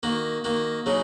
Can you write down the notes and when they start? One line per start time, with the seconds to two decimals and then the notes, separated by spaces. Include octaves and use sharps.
0.03 D#3 A#3 F#4
0.44 D#3 A#3 F#4
0.86 C#3 F#3 D#4